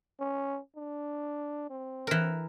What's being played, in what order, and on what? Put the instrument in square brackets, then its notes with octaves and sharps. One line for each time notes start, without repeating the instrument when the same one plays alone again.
[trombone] C#4
D4
C4
[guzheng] E3 A#4